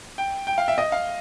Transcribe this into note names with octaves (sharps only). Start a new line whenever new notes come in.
G5
G5
F5
E5
D#5
F5